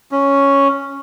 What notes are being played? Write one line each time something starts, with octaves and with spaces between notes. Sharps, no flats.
C#4